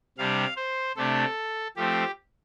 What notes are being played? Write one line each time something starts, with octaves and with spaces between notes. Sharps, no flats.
C3 G3 D4 F5
C5
C3 A3 D4 A4
F3 A3 C4 G4